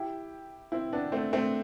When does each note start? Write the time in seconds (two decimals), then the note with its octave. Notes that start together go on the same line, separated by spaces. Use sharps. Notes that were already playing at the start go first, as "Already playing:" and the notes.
Already playing: E4 G4
0.72 C4 E4
0.93 B3 D4
1.12 A3 C4
1.33 A3 C4